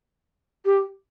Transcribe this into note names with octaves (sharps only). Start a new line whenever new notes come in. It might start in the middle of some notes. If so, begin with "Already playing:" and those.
G4